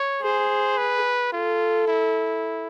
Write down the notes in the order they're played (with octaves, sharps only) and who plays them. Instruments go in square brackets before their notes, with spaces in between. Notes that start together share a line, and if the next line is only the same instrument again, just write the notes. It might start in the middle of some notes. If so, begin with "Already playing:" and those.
Already playing: [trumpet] C#5
[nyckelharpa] G#4 [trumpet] C5
[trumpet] B4
[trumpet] F4 [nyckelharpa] A4
[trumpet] E4